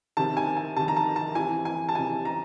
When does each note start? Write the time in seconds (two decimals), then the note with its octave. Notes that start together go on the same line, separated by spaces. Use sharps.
0.17 C3 D#3 A5
0.37 G#5
0.57 G#5
0.76 C3 D#3 A5
0.88 A#5
0.96 A5
1.16 A5
1.35 C3 E3 G#5
1.65 G#5
1.89 A5
1.95 C3 E3 G#5
2.25 A#5